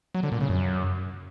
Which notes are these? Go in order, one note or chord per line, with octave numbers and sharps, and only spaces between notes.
F#3
D3
A#2
C#3
F#2